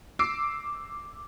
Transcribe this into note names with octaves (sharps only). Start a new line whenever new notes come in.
D6 E6 C7 D7